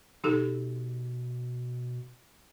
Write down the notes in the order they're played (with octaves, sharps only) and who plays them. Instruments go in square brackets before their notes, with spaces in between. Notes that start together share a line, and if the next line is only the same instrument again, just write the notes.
[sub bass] B2 [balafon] D#4 G4 A4